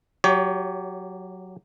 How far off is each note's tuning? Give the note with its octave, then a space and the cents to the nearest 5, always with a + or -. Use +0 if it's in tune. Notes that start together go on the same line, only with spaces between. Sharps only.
F#3 +0 G4 +0 C#5 +35